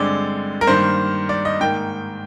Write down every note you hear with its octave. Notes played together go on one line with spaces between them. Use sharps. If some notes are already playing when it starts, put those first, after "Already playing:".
Already playing: G2 D3 G#3 C4 D5
A#4
G2 D#3 A#3 C5
D5
D#5
G#2 D#3 A#3 G5